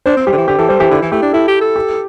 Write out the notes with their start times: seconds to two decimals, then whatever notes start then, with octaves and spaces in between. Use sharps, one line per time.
0.06 D4 C5
0.16 C4
0.27 G3 G4
0.32 D3
0.37 E3
0.48 D3 G4
0.58 E3 A4
0.69 G3 C5
0.79 E3 G4
0.91 D3 E4
1.02 E3
1.12 A3 G4
1.22 D4
1.33 E4 A4
1.48 G4
1.61 A4
1.76 G4